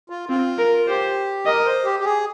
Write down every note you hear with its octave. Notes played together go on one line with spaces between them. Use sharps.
F4
C4 F4
A#4
G4 C5
A#4 D#5
C5
G4
G4
G#4